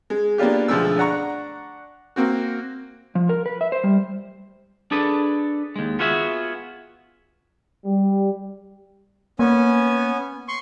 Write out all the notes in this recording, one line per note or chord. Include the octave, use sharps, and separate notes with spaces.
G#3
A#3 B3 D4 F4 G4
B1 D3 F3 G#3 A3 E6
D4 F#5 A#5 C#6
A#3 C4 F#4
F3
A#4
B4
E5
C5
G3
D4 G#4 A4 B4
D#2 G#3
B3 F4 F#4 G#4 E5
G3
A#3 B3 C#4 G#5
C6 C#6